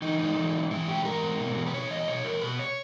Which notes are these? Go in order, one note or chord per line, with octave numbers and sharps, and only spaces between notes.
E3 D#4
G#2 D#4
E3
G#2
E3 E4
G#2 G4
E3 A#4
G#2
B2
E2
B4
B2 C#5
E2 D#5
B2 C#5
E2 A#4
B2 B4
C#5